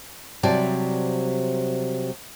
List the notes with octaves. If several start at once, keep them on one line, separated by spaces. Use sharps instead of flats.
C3 F#3 G3 D5 A5